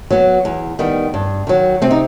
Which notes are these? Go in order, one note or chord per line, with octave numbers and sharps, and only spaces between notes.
F#3 B3
E2
D#3 G3 B3
G2
D#3 F#3
C3 C4
D#4